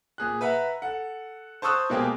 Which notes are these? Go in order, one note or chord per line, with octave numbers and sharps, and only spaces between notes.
A#2 G#4 F#6
B4 E5 F#5 A#5
A4 F#5
C5 A5 C#6 D#6 E6 F#6
B2 G#3 A#3 G4 G#4